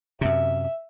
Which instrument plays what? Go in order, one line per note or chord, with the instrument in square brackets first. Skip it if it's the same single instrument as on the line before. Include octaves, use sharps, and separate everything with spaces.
[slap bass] F#2 C3 [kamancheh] E5